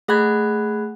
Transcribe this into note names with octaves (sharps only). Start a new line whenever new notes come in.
A3 G#4 F#5 B5 F#6 G#6